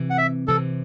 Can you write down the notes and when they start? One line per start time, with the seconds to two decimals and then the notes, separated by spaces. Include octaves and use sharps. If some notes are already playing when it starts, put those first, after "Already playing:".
Already playing: C3 E3 C4
0.10 F#5
0.18 E5
0.48 C3 E3 C4 A4